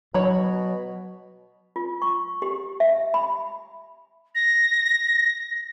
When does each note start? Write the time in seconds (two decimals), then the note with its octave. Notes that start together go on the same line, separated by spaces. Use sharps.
0.14 B2 F#3 C#5 B5
1.76 F4
2.02 C#6
2.42 G4
2.80 E5
3.14 B5
4.34 A#6